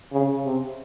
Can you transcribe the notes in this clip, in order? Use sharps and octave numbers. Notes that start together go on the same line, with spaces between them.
C#3
C3